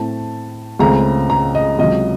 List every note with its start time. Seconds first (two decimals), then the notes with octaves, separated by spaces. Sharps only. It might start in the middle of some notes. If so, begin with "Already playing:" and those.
Already playing: A2 A3 C4 A5
0.79 C#2 C#3 A3 C4 A#5
1.30 A#5
1.55 D#5
1.79 C#2 C3 F#3 D#5